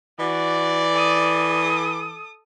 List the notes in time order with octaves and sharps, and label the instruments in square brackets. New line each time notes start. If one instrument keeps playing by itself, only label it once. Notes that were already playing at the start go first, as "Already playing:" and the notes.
[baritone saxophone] E3 [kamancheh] F#4 [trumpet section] D5
[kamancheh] A4 D#6